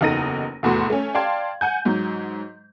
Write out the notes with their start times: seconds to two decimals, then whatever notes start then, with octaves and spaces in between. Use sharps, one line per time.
0.01 F#1 E2 D#4 A4 A#6 D#7
0.63 F1 E2 A2 F#4 C6
0.90 A3 C#4
1.15 D5 F5 G5 A5 C6 G#6
1.61 F#5 G#5 G6
1.85 G#2 F#3